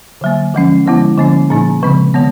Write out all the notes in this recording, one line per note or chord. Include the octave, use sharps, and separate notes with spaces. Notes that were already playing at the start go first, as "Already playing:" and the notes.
D3 F#3 A#3
D3 F3 G#3 C#4
D3 F3 G#3 B3 E4
D3 F3 A#3 C#4
A#2 F3 A#3 D#4
C#3 F3 G#3 C4
D#3 G#3 B3